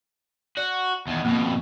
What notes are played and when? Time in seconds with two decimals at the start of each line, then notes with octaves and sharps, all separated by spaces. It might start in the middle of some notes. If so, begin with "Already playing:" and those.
0.57 F#4 D5
1.07 E2 D#3
1.25 F2 B2 A#3